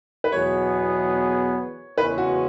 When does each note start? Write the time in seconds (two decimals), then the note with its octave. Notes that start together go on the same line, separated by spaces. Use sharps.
0.24 B4
0.32 E2 B2 F#3 B3 G#4 C#5
1.97 E2 C#3 E3 G#3 C#4 B4
2.18 F#4